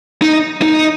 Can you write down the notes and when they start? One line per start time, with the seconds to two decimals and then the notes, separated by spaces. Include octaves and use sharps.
0.22 D#4
0.62 D#4